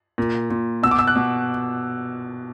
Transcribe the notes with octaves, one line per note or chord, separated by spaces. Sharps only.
A#2
A#2
B2 E6
D6
E6
F#6
B2